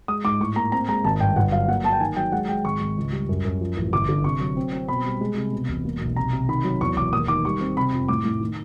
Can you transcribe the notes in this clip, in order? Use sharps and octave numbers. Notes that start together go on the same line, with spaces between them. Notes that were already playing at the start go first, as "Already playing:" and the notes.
G#3 D#6
G#2 D6
A2 C#6
A#3 A#5
C4 A#5
G#3 A#5
G#1 A5
G2 G5
G1 F#5
F#3 F5
A#3 F#5
A#3 A5
G5
D#3 G#5
F#3 G5
G#3 F#5
G#3 G5
G#1 C#6
G#1
C#2
G3
F#2
F#2
F3
A1
G1 D6
D3
C3 C#6
F#3
C4
C4
B2 B5
G3
G#3
C3
B2
E1
A#3
B1
C3 A#5
C3
D#3 B5
F#3
E2 C#6
E1 D6
D#2 D#6
D#3 D6
G3 C#6
C4
C3 B5
F2
A2 D6
A2
D#3